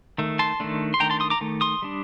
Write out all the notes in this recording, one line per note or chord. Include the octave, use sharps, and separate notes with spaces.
D#3 A3
A5 C6
D#3 A3 D4
C6
D#3 A3 D4 G5 A#5
A5 C6
C6 D#6
A#5 D6
D#3 A3
C6 D#6
G3 D4